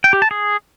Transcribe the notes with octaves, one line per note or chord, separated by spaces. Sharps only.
G5
G4
A5
G#4